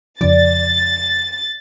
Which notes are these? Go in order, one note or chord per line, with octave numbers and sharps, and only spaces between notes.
F2 C#3 F3 D5 A6